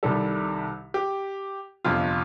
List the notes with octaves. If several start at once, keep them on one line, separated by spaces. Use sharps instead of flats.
C2 C3 D#3 G3 A4
G4
G1 F2 C3 F4